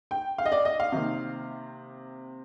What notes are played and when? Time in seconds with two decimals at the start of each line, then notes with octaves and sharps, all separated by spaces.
0.11 G5
0.38 F5
0.45 D#5
0.52 D5
0.65 D#5
0.80 F5
0.92 C3 D#3 A#3